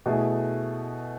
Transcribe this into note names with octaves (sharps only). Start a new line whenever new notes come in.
B2 A3 E4 G#4